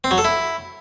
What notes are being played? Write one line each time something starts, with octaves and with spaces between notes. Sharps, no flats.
C4
F#3
A4
E4